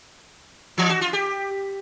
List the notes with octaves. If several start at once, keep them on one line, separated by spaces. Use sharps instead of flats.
E3
F#4
F4
G4